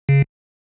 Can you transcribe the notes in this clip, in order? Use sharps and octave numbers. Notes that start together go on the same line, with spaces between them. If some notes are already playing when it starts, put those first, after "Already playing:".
C#3